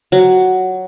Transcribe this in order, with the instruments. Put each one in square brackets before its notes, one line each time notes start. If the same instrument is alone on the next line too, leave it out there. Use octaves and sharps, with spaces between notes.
[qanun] F#3